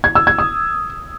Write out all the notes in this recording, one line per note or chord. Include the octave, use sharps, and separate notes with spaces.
G#6
E6
G#6
D#6